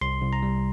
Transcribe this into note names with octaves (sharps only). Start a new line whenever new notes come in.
C2 C6
C2
A#5
G3